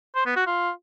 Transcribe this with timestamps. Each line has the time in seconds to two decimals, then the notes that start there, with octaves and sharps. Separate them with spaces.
0.15 C5
0.26 B3
0.36 F#4
0.46 F4